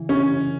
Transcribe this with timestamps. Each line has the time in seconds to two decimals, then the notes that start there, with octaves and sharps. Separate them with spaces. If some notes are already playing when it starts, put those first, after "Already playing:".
Already playing: C#3 E3
0.09 C#4